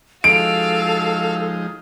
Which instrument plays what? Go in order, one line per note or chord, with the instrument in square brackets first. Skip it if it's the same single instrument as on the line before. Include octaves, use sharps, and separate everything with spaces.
[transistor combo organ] F3 G#3 D#4 [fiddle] F#4 F5 [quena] A4 [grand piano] D7